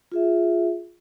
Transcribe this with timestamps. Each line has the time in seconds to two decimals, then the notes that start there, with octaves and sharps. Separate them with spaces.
0.12 F4 G#4 E5